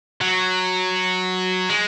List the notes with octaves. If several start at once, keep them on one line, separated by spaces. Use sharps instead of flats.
F#3
G#3